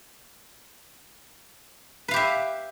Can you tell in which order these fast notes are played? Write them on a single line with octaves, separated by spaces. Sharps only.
B4 F5 G4 E5